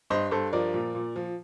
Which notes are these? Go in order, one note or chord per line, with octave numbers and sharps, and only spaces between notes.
G2 C5 D#5
G2 A4 C5
F3 A#4 D5
A#2
A#2
F3